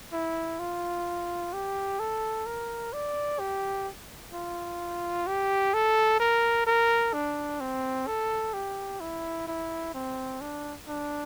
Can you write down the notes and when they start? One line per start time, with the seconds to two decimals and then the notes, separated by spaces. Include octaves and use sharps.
0.13 E4
0.59 F4
1.53 G4
2.00 A4
2.46 A#4
2.93 D5
3.39 G4
4.33 F4
5.27 G4
5.74 A4
6.20 A#4
6.67 A#4
7.13 D4
7.61 C4
8.07 A4
8.54 G4
9.00 E4
9.47 E4
9.94 C4
10.41 D4
10.88 D4